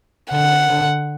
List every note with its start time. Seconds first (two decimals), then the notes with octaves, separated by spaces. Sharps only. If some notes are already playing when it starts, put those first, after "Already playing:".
0.31 D3 F#5
0.69 D3